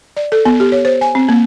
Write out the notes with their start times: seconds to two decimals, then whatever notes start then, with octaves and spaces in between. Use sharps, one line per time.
0.17 D5
0.32 A4
0.45 B3
0.60 G4
0.72 C#5
0.85 C5
1.01 G#5
1.15 C4
1.29 A#3